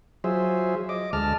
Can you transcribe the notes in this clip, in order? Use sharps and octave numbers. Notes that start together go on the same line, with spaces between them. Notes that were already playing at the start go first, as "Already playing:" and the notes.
F#3 F4 G#4 C5 E5
D#5 D6
D2 G#3 D#5 A5 F6